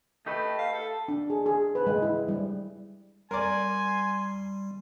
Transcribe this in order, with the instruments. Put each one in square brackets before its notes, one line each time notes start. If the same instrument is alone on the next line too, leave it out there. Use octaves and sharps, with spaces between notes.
[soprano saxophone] A3 [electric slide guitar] D#4 G4 B4
[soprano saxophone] F5
A4
[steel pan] D4
G#4
G#4
B4
G#3
E4
G3
[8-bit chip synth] G3 [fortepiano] A#4 D5 [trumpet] G#5 [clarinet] C6